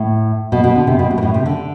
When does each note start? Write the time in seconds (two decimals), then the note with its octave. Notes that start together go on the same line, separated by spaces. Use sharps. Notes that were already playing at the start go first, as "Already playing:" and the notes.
Already playing: A2
0.52 B2
0.64 B2
0.75 D3
0.87 C3
0.99 B2
1.11 A2
1.18 B2
1.23 A2
1.34 C3
1.46 D3